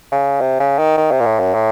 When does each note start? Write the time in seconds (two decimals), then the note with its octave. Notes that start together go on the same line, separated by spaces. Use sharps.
0.12 C#3
0.41 C3
0.60 C#3
0.79 D#3
0.97 D#3
1.12 C3
1.20 A#2
1.26 A2
1.40 F#2
1.54 A2